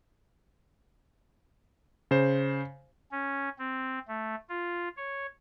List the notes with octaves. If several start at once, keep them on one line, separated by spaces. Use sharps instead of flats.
C#3 C5
C#4
C4
A3
F4
C#5